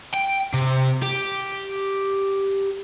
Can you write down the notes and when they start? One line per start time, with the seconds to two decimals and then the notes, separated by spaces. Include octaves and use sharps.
0.14 G5
0.54 C3
1.02 G4